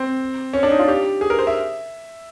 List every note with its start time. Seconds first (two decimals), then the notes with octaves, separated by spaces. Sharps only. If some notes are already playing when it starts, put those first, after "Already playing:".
Already playing: C4
0.53 C#4
0.63 D4
0.71 D#4
0.79 F4
0.88 G4
1.21 G#4
1.30 A#4
1.39 C5
1.47 E5